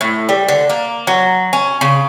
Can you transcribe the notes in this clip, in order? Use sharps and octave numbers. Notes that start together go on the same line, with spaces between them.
A2
G3
D3
A#3
F#3
C#4
C#3